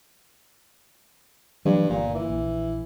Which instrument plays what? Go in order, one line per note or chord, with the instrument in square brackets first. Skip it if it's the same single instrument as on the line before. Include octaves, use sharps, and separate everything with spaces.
[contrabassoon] G2 [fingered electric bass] E3 F#3 A#3
[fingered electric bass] G1 [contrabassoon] A#2
[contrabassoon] E3
[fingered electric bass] A#1